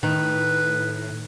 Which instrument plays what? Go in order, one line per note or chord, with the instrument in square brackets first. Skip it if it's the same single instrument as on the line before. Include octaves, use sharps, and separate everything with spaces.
[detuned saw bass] A2 [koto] D#3 [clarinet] B4